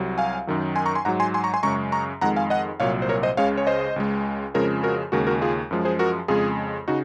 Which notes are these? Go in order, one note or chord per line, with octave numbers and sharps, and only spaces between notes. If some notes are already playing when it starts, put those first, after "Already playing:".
Already playing: C2 C3 F#3
F5 G#5
F#2 D#3 F#3
G#5 C6
A#5 C#6
G#5 C6
G#2 F#3 F#5 A#5
G#5 C6
G#5 C6
A#5 C#6
G#5 C6
F#2 C#3 G#3 A#5 C#6
A#5 C#6
F2 D#3 G#3 F#5 A#5
F5 G#5
D#5 F#5
C2 A#2 F#3 C#5 F5
C5
A#4 C#5
C5 D#5
C#2 C#3 G#3 C#5 F5
C#5
C5 D#5
C#2 C#3 G#3
F2 C#3 F3 G#3 A#4 C#5
F#4 A#4
D#2 C#3 G#3 F#4 A#4
F#4 A#4
F4 G#4
F#2 F3 G#3
G#4 C5
F#4 A#4
F2 C#3 G#3 F4 G#4
C#3 D#4 F#4